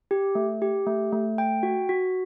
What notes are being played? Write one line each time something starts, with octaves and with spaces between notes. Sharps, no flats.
G4
A3
G4
A3
A3
G5
F#4
F#4